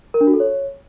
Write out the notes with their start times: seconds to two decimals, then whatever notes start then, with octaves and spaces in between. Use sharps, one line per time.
0.14 A#4
0.21 D4
0.27 F#4
0.34 A4
0.40 C#5